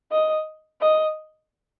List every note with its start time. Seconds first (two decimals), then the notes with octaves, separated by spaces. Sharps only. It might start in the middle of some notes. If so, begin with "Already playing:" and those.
0.12 D#5
0.81 D#5